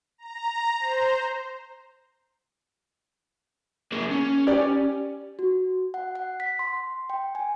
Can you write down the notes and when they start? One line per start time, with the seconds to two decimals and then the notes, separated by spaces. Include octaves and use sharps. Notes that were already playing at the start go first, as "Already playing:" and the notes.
0.18 A#5
0.79 C5
3.92 A#3 G#4 A#4
4.11 C#4
4.47 G4 D5
5.39 F#4
5.94 F#5
6.15 F#5
6.40 B6
6.59 C6
7.10 G5
7.35 G#5